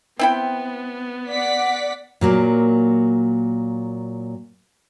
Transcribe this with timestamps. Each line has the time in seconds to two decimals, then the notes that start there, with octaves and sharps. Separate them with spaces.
0.19 B3 C4 E4 G5
1.30 D5 F#5 B6
2.21 A#2 F#3 A#3